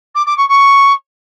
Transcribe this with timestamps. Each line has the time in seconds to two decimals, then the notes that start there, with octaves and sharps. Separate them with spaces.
0.15 D6
0.26 D6
0.37 C#6
0.48 C#6